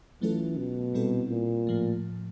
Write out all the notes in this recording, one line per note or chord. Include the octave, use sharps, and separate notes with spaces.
E3 F#3 A3 C#4 F4 A4
B2
A#2 G3 C4 E4 A4
A#2
A2 F3 A3